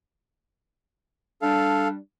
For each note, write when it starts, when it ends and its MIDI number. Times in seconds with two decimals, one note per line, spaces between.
1.42 1.97 55
1.42 1.97 62
1.42 1.88 69
1.42 1.88 77